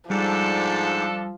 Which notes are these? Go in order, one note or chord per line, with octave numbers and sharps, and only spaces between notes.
G#2 F3 G3 D4 A4